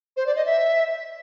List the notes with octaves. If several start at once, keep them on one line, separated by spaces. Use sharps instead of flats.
C5
D5
D#5
E5